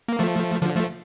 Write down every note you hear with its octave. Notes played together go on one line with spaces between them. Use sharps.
A#3
F3 A3
D3 F3
F3 A3